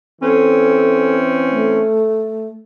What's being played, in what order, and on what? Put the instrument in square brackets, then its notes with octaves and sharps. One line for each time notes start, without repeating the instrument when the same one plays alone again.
[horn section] E3 C4 C#4 [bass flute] A4
[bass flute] A3